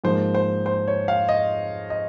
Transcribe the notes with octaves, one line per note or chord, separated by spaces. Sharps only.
G#2 F3 A#3 C5
C5
C5
C#5
F5
D#5
D#5